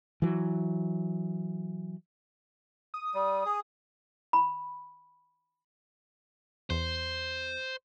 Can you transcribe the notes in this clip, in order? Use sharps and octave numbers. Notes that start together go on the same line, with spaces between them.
E3 F#3
D#6
G3
G#4
B5
E2 C5